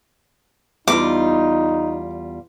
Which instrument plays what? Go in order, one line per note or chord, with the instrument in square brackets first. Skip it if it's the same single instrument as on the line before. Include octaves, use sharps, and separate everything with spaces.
[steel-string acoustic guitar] E2 G3 F4 [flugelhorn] D#4 [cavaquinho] D6